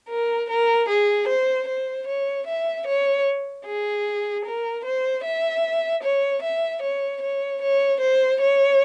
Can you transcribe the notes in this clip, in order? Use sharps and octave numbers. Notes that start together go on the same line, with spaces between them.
A#4
A#4
G#4
C5
C5
C#5
E5
C#5
G#4
A#4
C5
E5
C#5
E5
C#5
C#5
C#5
C5
C#5